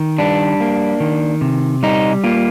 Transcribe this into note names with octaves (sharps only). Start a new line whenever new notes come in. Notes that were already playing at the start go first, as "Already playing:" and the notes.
Already playing: D#3
G3 D4
A#3
D#3
C3
G3 D#4
A#3 F4